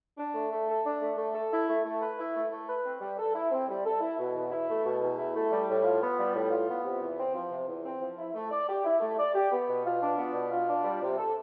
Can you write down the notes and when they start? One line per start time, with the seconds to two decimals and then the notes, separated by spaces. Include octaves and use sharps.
0.18 D4
0.34 A3
0.51 A3
0.68 A4
0.84 D4
1.01 A3
1.17 A3
1.34 A4
1.51 E4
1.68 A3
1.85 A3
2.01 B4
2.18 E4
2.35 A3
2.51 A3
2.68 B4
2.85 C4
3.01 G3
3.17 A4
3.34 E4
3.51 C4
3.68 G3
3.85 A4
4.01 E4
4.18 B2
4.35 E2
4.51 E4
4.68 A3
4.85 B2
5.01 E2
5.17 E4
5.34 A3
5.51 G3
5.68 A2
5.84 F4
6.00 B3
6.18 G3
6.34 A2
6.51 F4
6.68 B3
6.84 C3
7.01 E2
7.18 C4
7.34 F3
7.51 C3
7.68 E2
7.84 C4
8.01 F3
8.18 E4
8.34 A3
8.51 D5
8.68 G4
8.84 E4
9.01 A3
9.18 D5
9.34 G4
9.51 B3
9.68 B2
9.85 F4
10.01 D4
10.18 B3
10.34 B2
10.51 F4
10.68 D4
10.84 G3
11.01 C3
11.17 A4